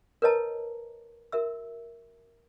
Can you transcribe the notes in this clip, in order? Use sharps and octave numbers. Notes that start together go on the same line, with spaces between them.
A#4 B4 C#5 D#5 A5 A#5
F#4 A#4 E5 E6